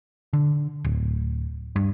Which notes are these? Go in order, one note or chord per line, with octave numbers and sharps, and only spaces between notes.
D3
D1
G2